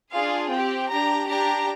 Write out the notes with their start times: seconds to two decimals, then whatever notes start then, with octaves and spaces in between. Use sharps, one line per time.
0.12 D4 F4 G#4 F5
0.50 C4 G4 G5
0.89 D4 G4 A#5
1.29 D4 G4 A#5